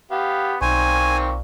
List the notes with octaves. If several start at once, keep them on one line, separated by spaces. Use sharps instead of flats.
B3 G4 F5
B1 A#2 D#3 C4 G#5 C#6